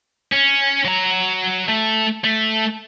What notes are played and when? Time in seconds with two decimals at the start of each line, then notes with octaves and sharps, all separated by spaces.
0.33 C#4
0.85 F#3 A#5
1.68 A3
2.24 A3